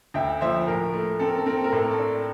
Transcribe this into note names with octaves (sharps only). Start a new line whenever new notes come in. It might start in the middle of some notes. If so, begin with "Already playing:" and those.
D2 E5 G5
F3 C5 E5
A2 A#4
A3
C4 A4
A#4
A4
C4 A#4
A4
A#4
A2 A4
A#4
A4
D4